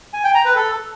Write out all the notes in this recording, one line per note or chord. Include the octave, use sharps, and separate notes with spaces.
G#5
G5
A#5
B4
A4